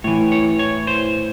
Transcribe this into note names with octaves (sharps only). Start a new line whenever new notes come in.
A2 E3 C#5
C#5
C#5
C5